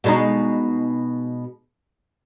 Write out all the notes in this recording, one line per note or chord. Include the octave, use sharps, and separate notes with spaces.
B2 G#3 D#4